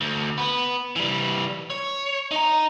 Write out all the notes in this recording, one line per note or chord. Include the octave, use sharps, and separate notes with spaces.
D2
B3 B4
E3 G3
C#5
D#4 A#5